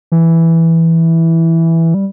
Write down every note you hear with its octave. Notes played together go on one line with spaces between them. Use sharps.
E3
G3